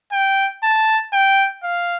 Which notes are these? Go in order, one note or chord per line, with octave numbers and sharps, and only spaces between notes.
G5
A5
G5
F5